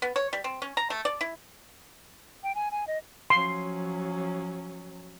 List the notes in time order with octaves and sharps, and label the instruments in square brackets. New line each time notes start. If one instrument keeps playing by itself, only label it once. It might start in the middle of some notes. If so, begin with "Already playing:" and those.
[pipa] B3
C#5
G3
C4
C#4
A#5
A3
D5
E4
[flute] G5
G#5
G#5
D#5
[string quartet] F3 F#3 C#4 [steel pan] C6